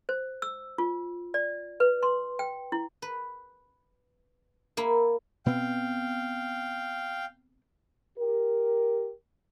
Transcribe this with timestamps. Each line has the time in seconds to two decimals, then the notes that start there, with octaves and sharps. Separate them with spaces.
0.09 C5
0.42 E6
0.78 F4
1.34 D5
1.80 B4
2.03 C6
2.39 G5
2.72 E4
3.02 B4
4.77 A#3 E4
5.46 B2 B3 C4 F5 G5
8.19 G4 A#4